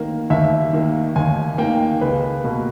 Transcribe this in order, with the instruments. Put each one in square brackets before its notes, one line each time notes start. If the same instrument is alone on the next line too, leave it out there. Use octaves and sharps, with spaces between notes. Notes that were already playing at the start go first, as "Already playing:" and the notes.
Already playing: [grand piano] D#3 A#3
D#2 E5
D#3 A#3
D#2 G#5
D#3 A#3 G5
C#2 B4
B2 A#3